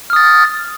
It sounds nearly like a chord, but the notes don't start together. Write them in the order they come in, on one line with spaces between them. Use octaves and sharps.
F6 D#6 A6